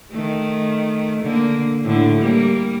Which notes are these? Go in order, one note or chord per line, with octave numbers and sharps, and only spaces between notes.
D#3 A3
D3 A#3
A2 D3
G3 A#3